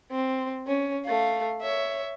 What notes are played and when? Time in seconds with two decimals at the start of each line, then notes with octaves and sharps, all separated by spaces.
0.11 C4
0.67 C#4
1.06 A3 F5
1.61 C#5 E5